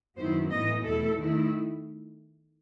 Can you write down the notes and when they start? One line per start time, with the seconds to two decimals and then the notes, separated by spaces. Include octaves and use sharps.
0.17 F#2 D#3 F#3 B3 E4 C5
0.50 A2 E3 B3 D#4 D#5
0.84 E2 B2 A3 E4 A4
1.18 D#3 A3 E4